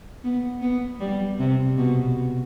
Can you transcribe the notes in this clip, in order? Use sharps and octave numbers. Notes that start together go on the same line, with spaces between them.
B3
B3
G3
C3
B2